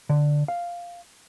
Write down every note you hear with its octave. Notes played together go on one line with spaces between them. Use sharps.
D3
F5